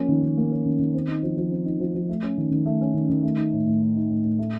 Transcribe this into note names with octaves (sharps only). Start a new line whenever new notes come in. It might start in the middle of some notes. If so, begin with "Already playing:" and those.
Already playing: F3 A#3 C#4
D#3
D#3
A#3
C#4
D#3
D#3
C4
D#4
F3
F3
C4
D#4
F3
F3
A3
C#4
D#3
D#3
A3
C#4
D#3
D#3
A3
D#4
A2
A2
A3
D#4
A2
A2
A3